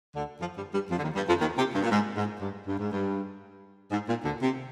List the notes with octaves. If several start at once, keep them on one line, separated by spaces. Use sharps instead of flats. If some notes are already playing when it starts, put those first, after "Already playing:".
D2 D3
F2 F3
G2 G3
G2 G3
F2 F3
D3
D#2 D#3
G2 G3
F2 F3
D#2 D#3
C3
G2
A#2
G#2
G#2
G2
G2
G#2
G2
G#2
A#2
D2 D3
C3